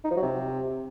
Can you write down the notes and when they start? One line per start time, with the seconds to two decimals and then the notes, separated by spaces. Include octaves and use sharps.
0.05 D#4
0.11 F3
0.17 F#3
0.23 C3